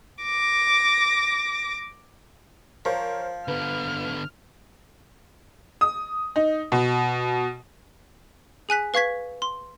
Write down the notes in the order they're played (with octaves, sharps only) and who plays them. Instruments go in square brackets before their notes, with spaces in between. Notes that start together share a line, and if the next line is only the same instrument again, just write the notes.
[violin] D6 A#6
[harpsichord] F3 [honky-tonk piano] A#4 C5 C#5
[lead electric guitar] D3 B3 [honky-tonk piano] B4 [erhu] F6
[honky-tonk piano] D#6
D#4
B2
[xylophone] G#4 G#5 F#6 B6
B4 F5 C#6 G#6 B6
C6